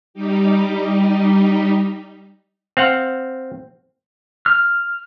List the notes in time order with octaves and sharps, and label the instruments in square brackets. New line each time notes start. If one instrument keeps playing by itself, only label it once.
[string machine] G3 D#4 G4
[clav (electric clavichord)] C4 F5 F#5
[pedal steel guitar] F6